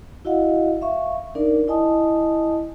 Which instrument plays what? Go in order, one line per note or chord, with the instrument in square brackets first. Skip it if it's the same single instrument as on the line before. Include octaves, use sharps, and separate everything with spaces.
[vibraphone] E4 F#4 D#5 F5 F#5
E5 F5 C#6
D4 D#4 A#4 D5
E4 D#5 G#5 A5 D#6